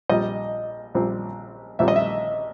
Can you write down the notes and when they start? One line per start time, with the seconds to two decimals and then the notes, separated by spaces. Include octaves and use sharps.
0.09 A#1 A#2 G3 C4 D#5
0.94 A#1 A#2 G3 C4
1.79 A#1 A#2 G3 C4 E5
1.88 D#5
1.96 E5